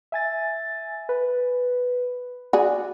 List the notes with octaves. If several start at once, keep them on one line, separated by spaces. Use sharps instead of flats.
E5 G#5 A6
B4
F#4 G#4 D5